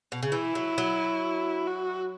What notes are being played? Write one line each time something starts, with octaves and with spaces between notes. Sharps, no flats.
B2
C#3
E3 E4
F#3
F#3
F#4